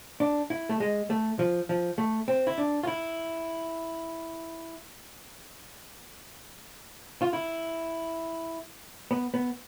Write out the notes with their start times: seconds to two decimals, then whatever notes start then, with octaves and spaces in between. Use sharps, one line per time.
0.20 D4
0.50 E4
0.69 A3
0.80 G#3
1.10 A3
1.39 F3
1.69 F3
1.98 A3
2.28 C4
2.47 E4
2.58 D4
2.83 F4
2.87 E4
7.22 F4
7.33 E4
9.11 B3
9.34 B3